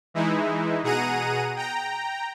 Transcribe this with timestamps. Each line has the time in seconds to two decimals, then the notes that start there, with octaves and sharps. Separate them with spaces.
0.14 E3 G#3 D#4 E4
0.83 B2 G#4 F#5 A#5 D#7
1.56 G5 A#5